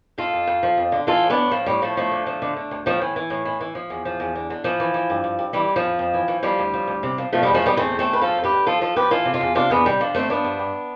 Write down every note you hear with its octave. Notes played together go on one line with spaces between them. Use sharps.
F2 F4 A4
F2
F2
F3
F2
D3
E3 F4 A4
A2
B3 D4
A2
A2 F3
A2 G3
A2 F3 A3
D2 F3 A3
D3
F3
D3
D3
D2
A2 F3
E3
E3
A2
E3
E3
F3
E2
F3
E2
D3
D3
E3 F3
E3
E3
G2
G2
G2
E3 G3
E3
F3
F2
F2
E3
E3
F3 G3
D2
F3
D2
C3
F3
B2 F3 A3
E2 G3 B3
F3 A3
B2 G3 B3
E2 A3 C4
E2
A3 C4
E2
B4
F3 F4 A4
F2
G4 B4
D3
F3 F4 A4
F3 F4 A4
F3 G4 B4
E3 F4 A4
C3
F4 A4
E2
C3 D4 F4
E2 B3 D4
C3 G3
D3 F3
G2 A3 C4
F3 B3 D4
G2
G2